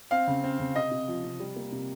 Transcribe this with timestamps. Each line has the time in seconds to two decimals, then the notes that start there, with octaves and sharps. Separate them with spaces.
0.11 C4 F5
0.27 C#3
0.44 C4
0.60 C#3
0.75 C3 D#5
0.91 C3
1.08 F3
1.24 C3
1.40 G3
1.56 A#3
1.72 C3